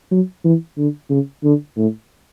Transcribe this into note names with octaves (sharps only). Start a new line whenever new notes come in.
F#3
E3
D3
C#3
D3
A2